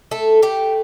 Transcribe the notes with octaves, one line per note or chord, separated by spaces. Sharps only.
A3 A4
A3 G4